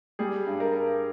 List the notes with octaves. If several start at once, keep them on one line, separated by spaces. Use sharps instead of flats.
G3 G#4
G2
A#4
G2